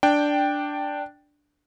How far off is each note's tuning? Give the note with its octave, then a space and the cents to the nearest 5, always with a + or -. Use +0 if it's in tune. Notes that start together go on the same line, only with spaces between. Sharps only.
D4 +0 G5 +0